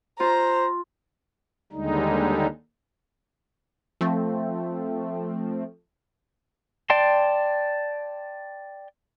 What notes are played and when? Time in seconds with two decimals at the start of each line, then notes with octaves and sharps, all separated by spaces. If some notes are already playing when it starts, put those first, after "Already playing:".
0.20 F4 C5 A#5
1.72 D#2 D3 G3 G#3 D#4
4.01 F3 A3 C4
6.90 D5 G5 A5 C6